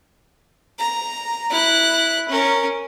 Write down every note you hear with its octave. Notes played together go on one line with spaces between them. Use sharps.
A#5
E4 F#6
C#4 A#4